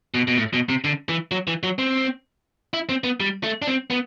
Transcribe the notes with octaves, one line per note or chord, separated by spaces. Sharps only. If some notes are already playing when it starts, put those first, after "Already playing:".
B2
B2
A2
B2
C3
D3
E3
F#3
E3
F#3
C4
E4
C4
B3
G3
A3
D4
C4
B3